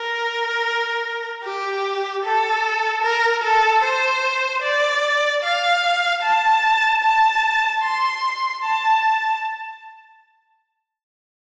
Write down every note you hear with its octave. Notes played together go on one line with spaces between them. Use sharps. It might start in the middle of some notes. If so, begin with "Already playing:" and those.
Already playing: A#4
G4
A4
A#4
A4
C5
D5
F5
A5
A5
C6
A5